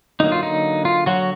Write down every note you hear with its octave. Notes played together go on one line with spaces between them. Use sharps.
D3 F#3 A#3 D#4
F4
D#4
F4
F#3 F#4